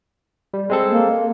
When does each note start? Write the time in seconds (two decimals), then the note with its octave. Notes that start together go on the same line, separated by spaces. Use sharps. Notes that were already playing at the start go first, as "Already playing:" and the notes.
0.54 G3
0.70 G#3 C4 A4
0.91 A#3